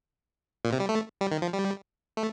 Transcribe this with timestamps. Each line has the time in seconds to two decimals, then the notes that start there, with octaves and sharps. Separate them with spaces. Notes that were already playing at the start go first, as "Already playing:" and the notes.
0.65 A#2
0.72 C3
0.80 G3
0.89 A3
1.21 G3
1.32 D#3
1.42 F3
1.53 G3
2.17 A3